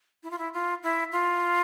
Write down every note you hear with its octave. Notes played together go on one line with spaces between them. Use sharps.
E4
F4
E4
F4
E4
F4